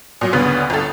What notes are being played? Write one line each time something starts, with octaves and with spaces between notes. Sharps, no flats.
A#2 F#3
D2 G2 C#3 B3
G1 A4